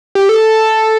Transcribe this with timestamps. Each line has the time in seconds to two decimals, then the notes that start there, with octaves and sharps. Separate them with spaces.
0.15 G4
0.29 A4